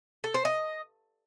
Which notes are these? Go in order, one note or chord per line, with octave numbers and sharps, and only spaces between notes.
A4
C5
D#5